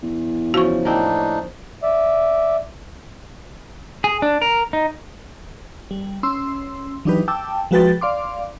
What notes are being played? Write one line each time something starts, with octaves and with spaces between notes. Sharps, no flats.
E2
C#3 F3 F#4 C#6
A2 A#3 C4 D4 D#4
D5 E5
G#4
D4
A#4
D#4
G3
C#4 C6 E6
E3 F#3 D4 D#4 G4 B4
G5 A5 D6 E6
F3 G#3 F#4 B4 G5 A6
D5 F5 C6 D6